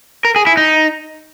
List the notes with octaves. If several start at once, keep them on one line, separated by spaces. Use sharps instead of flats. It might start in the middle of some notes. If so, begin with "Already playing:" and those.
A#4
G#4
E4
D#4